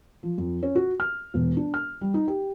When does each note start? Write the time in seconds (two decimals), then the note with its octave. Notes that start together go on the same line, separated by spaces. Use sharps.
0.23 F3
0.38 F2
0.63 C#4
0.75 F#4
1.00 F6
1.34 E1
1.57 D4
1.74 F6
2.01 G3
2.14 D#4
2.28 G4